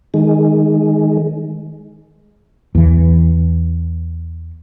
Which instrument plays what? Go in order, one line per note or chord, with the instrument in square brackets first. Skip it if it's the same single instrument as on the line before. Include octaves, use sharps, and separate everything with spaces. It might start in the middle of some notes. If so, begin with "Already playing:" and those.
[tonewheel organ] D#3 G#3
[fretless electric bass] E2 E3